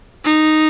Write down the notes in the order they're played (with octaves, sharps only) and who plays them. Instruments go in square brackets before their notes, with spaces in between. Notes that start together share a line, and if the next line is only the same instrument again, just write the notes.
[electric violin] D#4